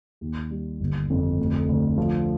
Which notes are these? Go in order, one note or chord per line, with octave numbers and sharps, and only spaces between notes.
D#2
G3
G1
F2
D2
D2
F3